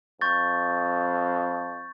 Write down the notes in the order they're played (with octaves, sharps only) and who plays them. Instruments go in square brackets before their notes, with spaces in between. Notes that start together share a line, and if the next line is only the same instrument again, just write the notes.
[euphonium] F2 [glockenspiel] C#6 G6 A6